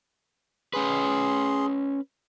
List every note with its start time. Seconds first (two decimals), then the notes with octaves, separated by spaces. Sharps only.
0.74 C#4 G#4 B4 C6